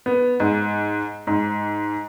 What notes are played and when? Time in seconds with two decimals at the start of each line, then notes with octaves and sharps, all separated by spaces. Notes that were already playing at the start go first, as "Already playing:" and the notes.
0.06 B3
0.40 G#2
1.27 G#2